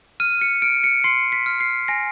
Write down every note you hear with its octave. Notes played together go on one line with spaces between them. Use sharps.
F6 D#7
C#7
F6 D7
C#7
C6 C7
B6
F6
C7
G#5 A#6